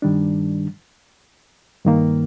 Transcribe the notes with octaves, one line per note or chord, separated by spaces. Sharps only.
G2 D#3 G3 D4
G2 D#3 A#3